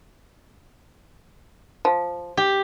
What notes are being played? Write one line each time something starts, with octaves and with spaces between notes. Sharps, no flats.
F3
G4